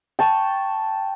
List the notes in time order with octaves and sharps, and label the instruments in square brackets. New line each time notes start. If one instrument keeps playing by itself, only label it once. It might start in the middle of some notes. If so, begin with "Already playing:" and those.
[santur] G5 A5 C#6